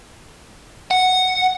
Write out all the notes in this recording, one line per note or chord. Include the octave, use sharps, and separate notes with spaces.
F#5